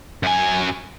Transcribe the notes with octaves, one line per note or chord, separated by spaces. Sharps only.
F#2 G#5